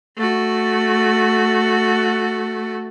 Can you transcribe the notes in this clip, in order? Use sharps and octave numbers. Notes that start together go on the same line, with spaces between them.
A3 F#4